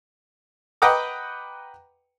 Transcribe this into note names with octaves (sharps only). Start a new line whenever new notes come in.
B4 D#5 F#5 G5 A#5 D6